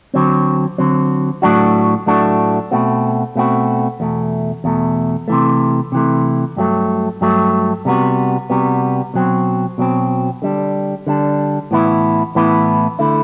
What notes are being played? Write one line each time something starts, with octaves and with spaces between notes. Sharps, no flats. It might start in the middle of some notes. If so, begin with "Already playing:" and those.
D3 F#3 C4
D3 F#3 C4
A2 F#3 A3 D4 F#4
A2 F#3 A3 D4 F#4
B2 A3 C4 F#4
B2 A3 C4 F#4
E2 B2 A3
E2 B2 A3
C3 E3 A3
C3 E3 A3
G2 F#3 A3
G2 F#3 A3
C3 G3 B3 F#4
C3 G3 B3 F#4
B2 F#3 C4
B2 F#3 C4
D3 G3 D4
D3 G3 D4
A2 E3 B3 E4
A2 E3 B3 E4
D3 A3 E4